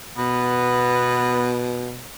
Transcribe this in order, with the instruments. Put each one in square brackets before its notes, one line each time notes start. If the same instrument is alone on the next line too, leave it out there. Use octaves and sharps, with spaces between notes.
[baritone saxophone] B2 [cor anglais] B3